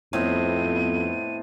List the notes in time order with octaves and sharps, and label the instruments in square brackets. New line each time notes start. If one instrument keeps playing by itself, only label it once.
[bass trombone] F2 [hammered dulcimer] A2 C4 D#5 [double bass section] B3 [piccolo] D#7